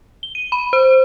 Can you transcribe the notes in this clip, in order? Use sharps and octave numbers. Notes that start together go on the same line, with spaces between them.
G7
D#7
B5
C5